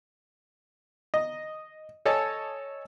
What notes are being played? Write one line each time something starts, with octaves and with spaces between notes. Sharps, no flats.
D#5
A4 C#5 D#5 G#5 A5